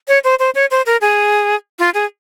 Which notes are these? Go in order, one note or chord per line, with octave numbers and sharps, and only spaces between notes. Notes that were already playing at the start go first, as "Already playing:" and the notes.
C#5
C5
C5
C#5
C5
A#4
G#4
F4
G#4